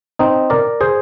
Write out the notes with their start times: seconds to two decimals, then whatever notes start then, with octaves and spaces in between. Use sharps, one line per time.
0.19 C4 D#4
0.50 A#4 D5
0.81 G#4 C5